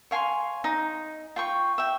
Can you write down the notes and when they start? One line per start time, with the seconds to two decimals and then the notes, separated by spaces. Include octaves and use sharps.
0.11 C#5 F5 G#5 C6
0.64 D#4
1.36 F4 G5 C#6
1.78 E5 G5